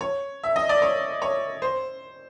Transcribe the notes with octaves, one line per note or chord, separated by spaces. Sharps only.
C#5
E5
D#5
D5
C#5
C#5
C5